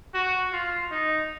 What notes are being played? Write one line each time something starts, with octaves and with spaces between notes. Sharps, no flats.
F#4
F4
D#4